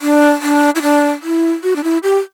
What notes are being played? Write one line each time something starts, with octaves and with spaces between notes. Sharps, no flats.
D4
D4
E4
D4
E4
F#4
D4
E4
G4